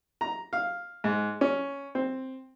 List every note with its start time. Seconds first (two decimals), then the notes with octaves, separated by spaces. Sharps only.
0.21 A#5
0.53 F5
1.04 G#2
1.41 C#4
1.95 C4